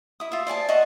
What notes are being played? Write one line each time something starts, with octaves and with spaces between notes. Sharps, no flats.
E4 D#6
F4 E5
C5 D5 G#5 A5
D#5 E5 F#5 C#6